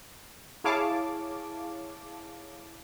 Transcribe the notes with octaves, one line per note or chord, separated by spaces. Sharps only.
E4 G#4 C#5 F5 A5 D6